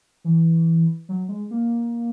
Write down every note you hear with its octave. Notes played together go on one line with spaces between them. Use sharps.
E3
F#3
G#3
A#3